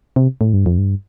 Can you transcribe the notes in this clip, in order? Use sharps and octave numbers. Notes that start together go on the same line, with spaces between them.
C3
A2
G2
F2
G2